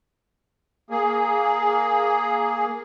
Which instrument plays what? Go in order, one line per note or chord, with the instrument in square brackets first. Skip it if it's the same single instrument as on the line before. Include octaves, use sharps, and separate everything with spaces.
[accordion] A#3 G#4